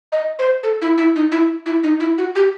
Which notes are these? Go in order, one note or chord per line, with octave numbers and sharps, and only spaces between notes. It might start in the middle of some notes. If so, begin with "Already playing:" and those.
D#5
C5
A4
E4
E4
D#4
E4
E4
D#4
E4
F#4
G4